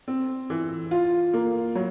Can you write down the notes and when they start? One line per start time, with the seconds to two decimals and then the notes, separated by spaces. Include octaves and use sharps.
0.08 C4
0.50 E3
0.91 F4
1.33 A#3
1.75 F#3